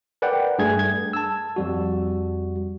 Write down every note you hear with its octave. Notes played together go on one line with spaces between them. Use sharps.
A#4 B4 D5 F#5 G5
G2 A3 G#4 G#6
G#6
A5 E6
F2 G3 F#4